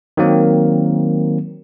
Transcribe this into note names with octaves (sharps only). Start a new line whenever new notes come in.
D#3 F#3 A#3 C4